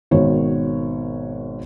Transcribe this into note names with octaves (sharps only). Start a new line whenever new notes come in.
G#1 B2 D#3 C#5